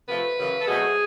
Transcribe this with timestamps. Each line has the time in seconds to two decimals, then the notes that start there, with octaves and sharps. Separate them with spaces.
0.08 C3 F3 A3 B4
0.38 F#2 C#3 E3
0.60 A4
0.67 B2 F#3 A3 C4 G#4